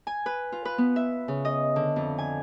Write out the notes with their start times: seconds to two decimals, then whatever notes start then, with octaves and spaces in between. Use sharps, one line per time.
0.07 G#5
0.26 B4
0.52 F4
0.65 B4
0.78 B3
0.96 E5
1.28 C#3
1.45 D#5
1.76 D3
1.96 F2
2.18 G#5